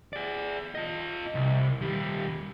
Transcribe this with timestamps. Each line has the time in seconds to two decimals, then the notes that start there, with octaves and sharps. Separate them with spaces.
0.13 G#4 D5
0.75 F4 D#5
1.35 C2
1.81 D#2 G3